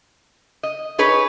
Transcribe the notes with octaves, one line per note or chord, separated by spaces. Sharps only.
D#5
D#4 G#4 B4 C#5